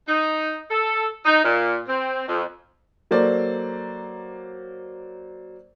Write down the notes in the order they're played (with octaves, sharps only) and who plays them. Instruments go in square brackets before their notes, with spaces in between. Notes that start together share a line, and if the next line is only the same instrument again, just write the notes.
[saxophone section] D#4
A4
D#4
A#2
C4
F2
[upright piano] F#3 A#3 A4 C5 D5